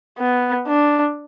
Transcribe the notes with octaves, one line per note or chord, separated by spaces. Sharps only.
B3
D4